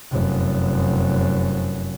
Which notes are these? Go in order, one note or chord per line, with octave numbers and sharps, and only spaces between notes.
F1 F#2